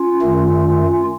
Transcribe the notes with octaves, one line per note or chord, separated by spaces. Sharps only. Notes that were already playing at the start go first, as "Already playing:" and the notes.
Already playing: C#4 F4
F#2 D#3 A3